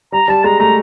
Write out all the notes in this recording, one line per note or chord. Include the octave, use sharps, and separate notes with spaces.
G3 A#5
G3 A5
G#3 A#5
A3 A#5